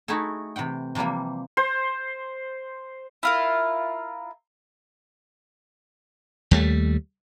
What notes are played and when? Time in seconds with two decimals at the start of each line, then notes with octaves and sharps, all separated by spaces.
0.08 A3 D#4 E4 F#4 G#4 A4
0.56 C3 E3 F#5 G5
0.95 C3 E3 F3 G3 A#3
1.57 C5
3.23 E4 F4 A#4
6.51 D#2 G3 A3